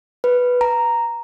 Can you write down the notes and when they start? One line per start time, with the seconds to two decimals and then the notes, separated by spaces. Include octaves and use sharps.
0.24 B4
0.61 A#5